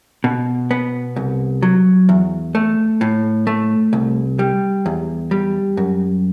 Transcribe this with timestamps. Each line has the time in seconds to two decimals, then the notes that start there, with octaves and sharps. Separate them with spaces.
0.24 B2
0.71 B3
1.16 C2
1.62 F#3
2.09 E2
2.55 A3
3.01 A2
3.47 A3
3.93 C2
4.39 G3
4.86 E2
5.31 G3
5.77 F#2